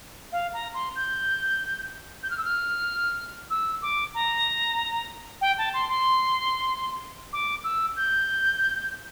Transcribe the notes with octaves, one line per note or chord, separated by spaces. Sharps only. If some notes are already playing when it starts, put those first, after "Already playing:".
F5
A#5
C6
G6
G6
F6
E6
F6
E6
D6
A#5
G5
A5
C6
C6
D6
E6
G6